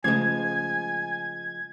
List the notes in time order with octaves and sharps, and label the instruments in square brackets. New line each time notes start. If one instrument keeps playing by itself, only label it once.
[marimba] C#3 A3 C#4 [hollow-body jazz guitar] F3 G#3 [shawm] G#5 [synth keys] G#6